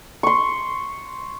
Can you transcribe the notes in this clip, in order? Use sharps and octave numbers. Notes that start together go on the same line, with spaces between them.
C6 C#6